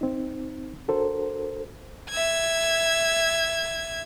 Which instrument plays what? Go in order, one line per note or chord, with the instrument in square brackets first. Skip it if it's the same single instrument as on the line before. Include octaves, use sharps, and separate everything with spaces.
[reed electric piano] C4 D#4
D4 F#4 A4 A#4 C5
[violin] E5 G#6